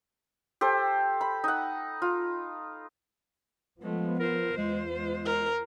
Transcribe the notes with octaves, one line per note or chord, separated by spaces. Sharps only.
G4 A4 C5
B5
D#4 F#5
F4
F3 G#3 A3 B3
F4 A#4 C5
E2 G#3
G#3
A#4